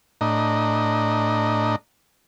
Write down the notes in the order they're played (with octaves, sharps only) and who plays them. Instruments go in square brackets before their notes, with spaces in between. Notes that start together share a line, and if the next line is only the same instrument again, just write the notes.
[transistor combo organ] A2 D4 D#5 A#5